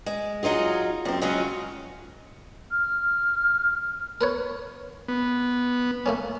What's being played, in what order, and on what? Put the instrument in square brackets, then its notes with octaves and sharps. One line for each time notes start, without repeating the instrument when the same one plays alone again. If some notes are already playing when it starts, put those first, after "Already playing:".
[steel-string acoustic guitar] G#3
F#3 D#4 F4 G#4
F#2 C4
C#3 F#3 G#3 C#4 F4
[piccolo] F6
[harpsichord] A#4 B4 C#5
[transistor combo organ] B3
[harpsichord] A3 A#3 C#4